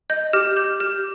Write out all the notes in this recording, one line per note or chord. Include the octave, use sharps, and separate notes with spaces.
D#5 G6
G4 F6
G4 G6
G4 F6